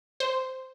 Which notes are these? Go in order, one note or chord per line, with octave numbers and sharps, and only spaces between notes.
C5